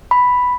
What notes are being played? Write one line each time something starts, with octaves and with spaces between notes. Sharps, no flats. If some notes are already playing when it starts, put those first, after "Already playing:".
B5